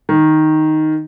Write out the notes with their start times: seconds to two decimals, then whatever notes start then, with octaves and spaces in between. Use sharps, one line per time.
0.09 D#3